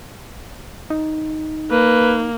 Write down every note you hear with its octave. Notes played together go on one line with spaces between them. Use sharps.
D#4
A#3 B4